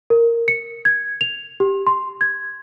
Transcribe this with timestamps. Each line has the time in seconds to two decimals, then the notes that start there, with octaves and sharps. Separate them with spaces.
0.10 A#4
0.48 C#7
0.85 G#6
1.21 F7
1.60 G4
1.87 C6
2.21 G#6